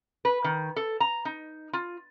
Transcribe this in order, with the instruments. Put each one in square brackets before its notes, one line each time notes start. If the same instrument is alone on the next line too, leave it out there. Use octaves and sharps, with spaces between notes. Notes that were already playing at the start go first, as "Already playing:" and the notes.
[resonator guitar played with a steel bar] B4
D#3
A4
A#5
D#4
F4